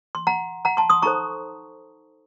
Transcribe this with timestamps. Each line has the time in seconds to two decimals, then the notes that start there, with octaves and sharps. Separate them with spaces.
0.15 C6
0.27 F#5 A#5
0.65 F#5 A#5
0.77 A5 C6
0.90 C6 D#6
1.02 D#4 A4 C5 A#5 C#6